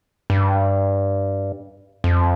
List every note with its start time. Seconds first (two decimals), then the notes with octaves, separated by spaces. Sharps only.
0.30 G2
2.04 F2